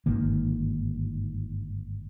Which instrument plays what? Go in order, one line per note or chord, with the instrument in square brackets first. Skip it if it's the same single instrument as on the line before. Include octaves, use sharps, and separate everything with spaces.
[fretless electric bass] G1 G#2 D#3 A#3